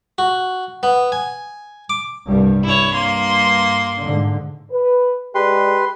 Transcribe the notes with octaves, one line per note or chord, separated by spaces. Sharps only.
F#4
B3
G#5
D6
C2 G2 G3
G2 E4 C#5
A#3 C6
G#2 D3
B4
G#3 G4 G#4 B4 D5 C6